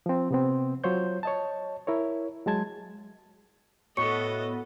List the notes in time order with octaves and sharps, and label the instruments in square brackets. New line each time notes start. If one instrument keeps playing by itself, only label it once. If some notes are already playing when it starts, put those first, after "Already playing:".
[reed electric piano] F3 C4
C3 B3 C4
F#3 F4 C5 C#5 G6
C#5 D#5 A5
E4 A#4 C#5
F#3 G#3 A5 G#6
[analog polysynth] A2 B3 F#4 [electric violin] A4 D#5 [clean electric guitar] C#5 [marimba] C#6